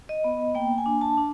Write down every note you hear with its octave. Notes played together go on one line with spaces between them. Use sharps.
D#5
B3
A#3 G5
G#5
D4
A5
D4